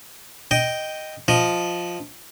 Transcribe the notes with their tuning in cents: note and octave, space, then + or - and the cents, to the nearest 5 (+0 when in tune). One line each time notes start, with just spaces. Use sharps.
D#5 +0 G5 -5
F3 +5 D#5 +10